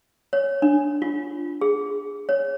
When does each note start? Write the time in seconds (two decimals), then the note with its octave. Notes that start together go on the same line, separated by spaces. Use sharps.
0.33 C#5
0.62 D4
1.02 F4
1.61 G#4
2.29 C#5